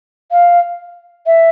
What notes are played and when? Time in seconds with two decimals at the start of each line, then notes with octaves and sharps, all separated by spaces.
0.32 F5
1.26 E5